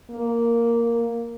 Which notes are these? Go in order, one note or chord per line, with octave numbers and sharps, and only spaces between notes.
A#3